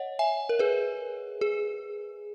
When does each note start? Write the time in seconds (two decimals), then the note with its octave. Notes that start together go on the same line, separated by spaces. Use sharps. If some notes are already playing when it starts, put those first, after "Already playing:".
Already playing: C#5 D#5 F#5
0.19 E5 G#5
0.49 A#4
0.59 G#4 B4
1.41 G#4